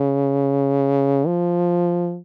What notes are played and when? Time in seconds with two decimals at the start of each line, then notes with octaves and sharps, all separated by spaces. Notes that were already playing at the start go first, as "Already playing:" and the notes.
Already playing: C#3
1.27 F3